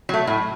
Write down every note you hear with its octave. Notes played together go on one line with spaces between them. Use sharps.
F#3 A3
A2